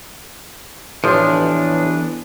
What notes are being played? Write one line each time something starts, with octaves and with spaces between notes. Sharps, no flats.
A1 E3 F3 B3 D4